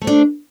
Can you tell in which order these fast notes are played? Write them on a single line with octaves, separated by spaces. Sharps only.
A3 C5 D4